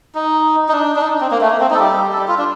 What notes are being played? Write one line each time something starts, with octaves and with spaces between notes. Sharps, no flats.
D#4
D#4
D4
D4
D#4
C4
A#3
A3
A#3
C4
D#4
A4
G3 G4
A4
G3 G4
F4
D4